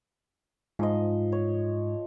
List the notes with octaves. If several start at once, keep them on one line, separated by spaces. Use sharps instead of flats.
G#2 F3 D#5
C#5